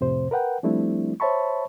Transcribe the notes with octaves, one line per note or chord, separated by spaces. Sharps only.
F2 A2 C3 C5
A#4 B4 F#5 G5
F3 G3 A3 C4 D4 E4
C5 C#5 E5 A5 B5 C#6